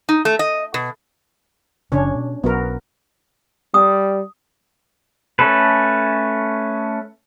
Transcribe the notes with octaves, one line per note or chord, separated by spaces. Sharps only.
D#4
A3
D#5
B2
F#1 C#3 F3 C#4 D4 C#5
B2
B1 F#3 B3 F#4 A#4
G3 D#6
A3 C#4 A4 B4